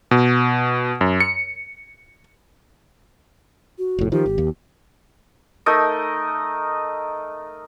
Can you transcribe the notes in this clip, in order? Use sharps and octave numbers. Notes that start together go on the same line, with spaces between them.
B2
F#2
C#7
F#4
F1 A2
D#3 F3 G4
G#1
D#2
A3 D#4 A#4 D#5